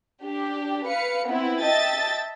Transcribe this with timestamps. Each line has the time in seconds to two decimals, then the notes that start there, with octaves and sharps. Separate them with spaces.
0.24 D4 G4
0.86 B4 F5 C#7
1.27 B3 C4 E4
1.61 D#5 E5 G5 A5 A6